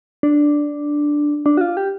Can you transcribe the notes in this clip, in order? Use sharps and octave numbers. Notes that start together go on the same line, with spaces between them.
D4
D4
F#4
F4
G4